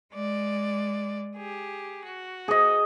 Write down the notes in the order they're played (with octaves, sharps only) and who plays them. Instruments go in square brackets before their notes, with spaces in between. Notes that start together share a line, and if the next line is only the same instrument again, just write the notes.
[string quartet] G#3 D5
G4 G#4
F#4
[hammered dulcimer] G#4 D#5